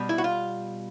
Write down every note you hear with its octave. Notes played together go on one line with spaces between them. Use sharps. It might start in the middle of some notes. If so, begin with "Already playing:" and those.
Already playing: B2 G3
E4
F#4
F4